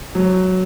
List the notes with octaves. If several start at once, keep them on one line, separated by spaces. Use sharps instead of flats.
F#3